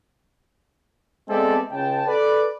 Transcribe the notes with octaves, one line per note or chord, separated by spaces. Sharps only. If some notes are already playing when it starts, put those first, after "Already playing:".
G#3 B3 C4 A4 D5 E5
C#2 G5 A5
A4 B4 D5